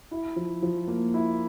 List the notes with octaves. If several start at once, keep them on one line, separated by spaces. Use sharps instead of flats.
E4
F3
F3
A#3
E4